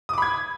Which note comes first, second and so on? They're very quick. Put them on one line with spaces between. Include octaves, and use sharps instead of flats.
D#6 D6 B5 G#6